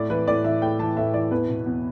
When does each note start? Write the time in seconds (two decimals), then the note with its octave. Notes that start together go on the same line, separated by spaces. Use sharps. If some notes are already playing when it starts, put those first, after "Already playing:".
Already playing: A2 D5
0.10 E3 B4
0.28 A2 D5
0.44 E3 E5
0.62 A2 G5
0.79 E3 A5
0.97 A2 E5
1.14 E3 D5
1.31 E2 B4
1.49 B2
1.66 E2